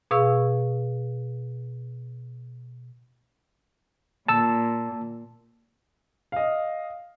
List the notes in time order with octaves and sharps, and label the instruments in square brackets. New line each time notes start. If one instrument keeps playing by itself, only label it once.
[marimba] B2 G#4 F5 C#6 E6
[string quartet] A#2 [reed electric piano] A5 E6
[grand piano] D#5 F5